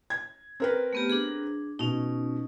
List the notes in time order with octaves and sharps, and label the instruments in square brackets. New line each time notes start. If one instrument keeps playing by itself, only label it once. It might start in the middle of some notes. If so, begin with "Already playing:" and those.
[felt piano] G#6
C4 A#4 B4
[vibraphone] A3 B3 G4
D4 G#4
[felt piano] B2 [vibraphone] C#4 D#4